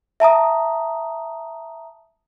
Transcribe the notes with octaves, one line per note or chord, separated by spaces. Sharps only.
E5 A5 A#5 D#6